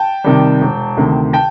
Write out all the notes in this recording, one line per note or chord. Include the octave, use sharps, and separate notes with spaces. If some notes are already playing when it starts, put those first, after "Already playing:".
Already playing: G5 A5
C3 D#3 G3
E1
D2 C3 D#3
G5 A5